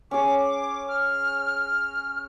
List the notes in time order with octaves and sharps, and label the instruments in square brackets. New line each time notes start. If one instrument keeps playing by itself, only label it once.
[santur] C#4 G#4 [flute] D6
[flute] F6